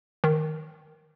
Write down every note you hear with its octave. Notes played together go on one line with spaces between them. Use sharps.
D#3